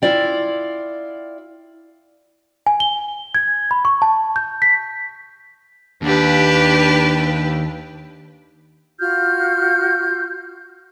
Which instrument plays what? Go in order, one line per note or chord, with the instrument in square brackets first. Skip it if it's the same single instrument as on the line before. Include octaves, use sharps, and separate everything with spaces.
[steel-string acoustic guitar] E4 F4 D5 G5
[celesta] G#5
G7
G#6
B5
C#6
A5
G6
B6
[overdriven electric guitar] D#2 [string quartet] D4 G4 B4
[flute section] F4 F#4 F6 G6